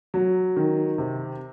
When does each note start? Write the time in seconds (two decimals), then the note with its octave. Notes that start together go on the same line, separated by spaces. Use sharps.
0.14 F#3
0.57 D#3
0.98 C3